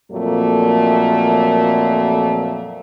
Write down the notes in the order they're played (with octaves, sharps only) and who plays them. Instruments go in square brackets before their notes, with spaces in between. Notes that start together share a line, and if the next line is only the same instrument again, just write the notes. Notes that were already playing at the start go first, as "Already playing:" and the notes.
[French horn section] F2 A#2 F#3 A3 A#3 A#4